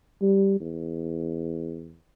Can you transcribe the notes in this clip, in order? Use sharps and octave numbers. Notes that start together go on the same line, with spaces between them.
G3
E2